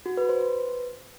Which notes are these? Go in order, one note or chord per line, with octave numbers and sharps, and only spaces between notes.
F#4
B4
C5
B4